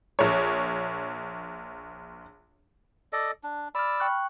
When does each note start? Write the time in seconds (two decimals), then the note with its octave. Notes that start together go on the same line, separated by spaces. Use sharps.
0.19 A#1 C#5
3.13 A4 D5 D#5
3.43 D4
3.75 D5 B5 E6 F6
4.00 G5 C#6 F#6